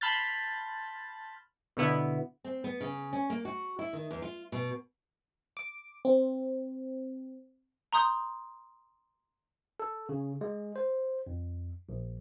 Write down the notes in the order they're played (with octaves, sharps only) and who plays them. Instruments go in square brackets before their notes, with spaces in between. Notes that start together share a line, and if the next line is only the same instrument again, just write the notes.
[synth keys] A5 B5 C6 F6 G6 A6
B2 D3 B3 E4
[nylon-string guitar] C4
B3
C#3
C#4
A#3
F#4
E4
D#3
E2
F4
B2
[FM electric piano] D6
C4
[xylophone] A#5 C6 D#6 G6
[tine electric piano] A4
C#3
G#3
C5
F2
A#1